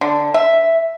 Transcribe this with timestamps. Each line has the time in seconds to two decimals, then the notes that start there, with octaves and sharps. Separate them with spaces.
0.01 D3
0.34 E5